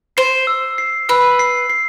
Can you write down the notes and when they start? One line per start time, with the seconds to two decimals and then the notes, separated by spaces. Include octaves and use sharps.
0.17 C5 C7
0.47 E6
0.78 C7
1.09 B4 E6
1.39 C7
1.70 C7